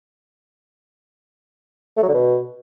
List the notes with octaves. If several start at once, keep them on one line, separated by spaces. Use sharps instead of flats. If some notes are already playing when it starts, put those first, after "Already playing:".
A3
F#3
D3
B2